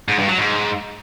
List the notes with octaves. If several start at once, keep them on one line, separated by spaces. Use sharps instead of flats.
G#2
G2
F#3
G#2